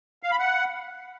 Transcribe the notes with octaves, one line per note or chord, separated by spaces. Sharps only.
F5
B5
F#5